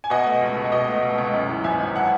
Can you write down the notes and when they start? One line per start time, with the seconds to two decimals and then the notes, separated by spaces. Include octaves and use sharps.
0.04 G#5
0.10 B2 D#5 F#5
0.26 A3
0.41 C#2
0.57 C#2
0.72 B2 D#5
0.88 A3
1.03 C#2
1.18 C#2
1.34 F#2
1.49 E3
1.64 G#1 E5 G#5
1.80 G#1
1.95 F#5 A5